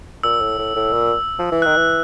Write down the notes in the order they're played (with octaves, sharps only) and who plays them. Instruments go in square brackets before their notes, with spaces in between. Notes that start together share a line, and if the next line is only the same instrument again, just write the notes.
[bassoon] A#2 [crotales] E6
[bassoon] A2
A2
A2
A#2
F3
E3
[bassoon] D#3 [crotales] F#6
[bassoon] E3